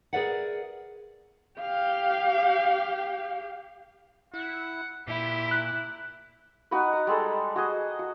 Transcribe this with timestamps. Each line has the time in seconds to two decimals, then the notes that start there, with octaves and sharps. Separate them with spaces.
0.13 G#4 A#4 B4 D5 E5 F#5
1.60 G4 F5
4.34 E4 F#5
5.08 A#2 E4 G4
5.51 F#6
6.71 D#4 F#4 B4
6.93 A#5
7.07 G3 G#3 A4
7.56 F#4 G#4 D#5
7.99 F#4